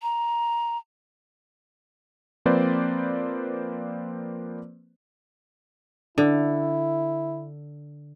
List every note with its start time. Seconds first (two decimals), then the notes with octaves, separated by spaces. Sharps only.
0.02 A#5
2.46 F3 A#3 C4 B4 C5 D5
6.18 D3 E4